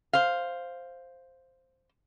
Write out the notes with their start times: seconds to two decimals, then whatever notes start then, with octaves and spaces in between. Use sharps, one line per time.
0.13 C5 F5